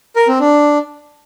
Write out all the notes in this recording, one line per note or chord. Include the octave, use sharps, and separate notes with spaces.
A#4
C4
D4